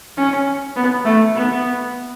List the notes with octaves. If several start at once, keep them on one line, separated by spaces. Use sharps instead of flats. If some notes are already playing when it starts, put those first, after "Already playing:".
C#4
B3
A3
B3